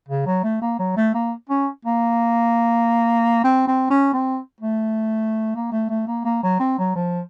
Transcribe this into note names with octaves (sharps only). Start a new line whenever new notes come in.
C#3
F#3
A3
A#3
F#3
A3
A#3
C#4
A#3
C4
C4
C#4
C4
A3
A#3
A3
A3
A#3
A#3
F#3
C4
F#3
F3